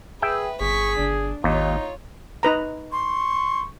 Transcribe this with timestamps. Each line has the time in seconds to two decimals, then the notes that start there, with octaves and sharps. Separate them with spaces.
0.22 G#4 B4 E5 G5
0.61 G1 G#4 C#6 B6
0.98 G1 D4
1.44 G#1 D#2 D#4 F4 C#5
2.43 D#4 B4 A#5
2.92 C6 C#6